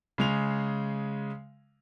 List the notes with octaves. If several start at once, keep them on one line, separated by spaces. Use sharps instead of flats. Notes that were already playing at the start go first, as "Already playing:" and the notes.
C#3 G#3 F7